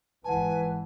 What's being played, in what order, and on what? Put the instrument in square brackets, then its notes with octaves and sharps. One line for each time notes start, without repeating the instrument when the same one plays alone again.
[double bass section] G#1 E3 [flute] B4 [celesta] F#5 A5 [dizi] G#5